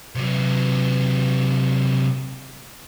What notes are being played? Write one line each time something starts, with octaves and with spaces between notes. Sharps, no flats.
C3 F#3